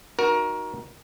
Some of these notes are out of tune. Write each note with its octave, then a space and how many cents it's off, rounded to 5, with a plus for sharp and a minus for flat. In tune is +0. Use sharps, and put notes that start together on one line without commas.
D#4 +0 F#4 +0 A#4 +20